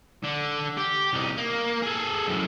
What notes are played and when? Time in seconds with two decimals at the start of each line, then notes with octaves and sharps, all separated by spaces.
0.24 D3 D4
0.77 G4
1.13 C2 D#4
1.37 A#3
1.83 G#4 A4
2.28 F#2 A2